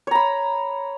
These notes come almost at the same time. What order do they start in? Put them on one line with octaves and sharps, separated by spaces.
C#5 A#5 B5